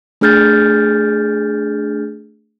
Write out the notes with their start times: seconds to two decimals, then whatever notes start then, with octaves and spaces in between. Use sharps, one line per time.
0.21 A3 D4 G#4 F6 G6 A6